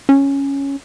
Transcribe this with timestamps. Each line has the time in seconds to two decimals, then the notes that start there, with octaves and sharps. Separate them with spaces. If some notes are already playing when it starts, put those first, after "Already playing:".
0.09 C#4